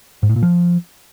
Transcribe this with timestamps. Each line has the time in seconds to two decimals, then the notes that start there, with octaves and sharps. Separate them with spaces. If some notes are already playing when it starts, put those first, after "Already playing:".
0.23 G#2
0.29 A2
0.36 A#2
0.43 F3